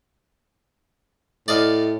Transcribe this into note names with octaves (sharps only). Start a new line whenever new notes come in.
A2 D5 D#5 F5